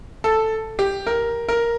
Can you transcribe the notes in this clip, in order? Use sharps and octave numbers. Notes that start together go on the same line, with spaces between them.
A4
G4
A#4
A#4